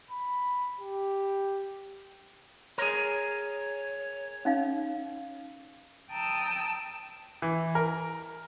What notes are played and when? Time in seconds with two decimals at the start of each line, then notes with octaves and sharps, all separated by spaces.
0.11 B5
0.80 G4
2.78 G#4 A#4 C#5
4.45 C#4 D#4 F5
6.11 G5 A5 A#5 D#6 E6
7.42 E3
7.75 A#4